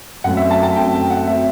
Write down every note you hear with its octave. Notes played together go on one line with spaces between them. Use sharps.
F#2 F#3 A3 C4 F#5
E5
A5
A5
F#2 F#3 A3 C4 G5
F#5
F#3 A3 C4 E5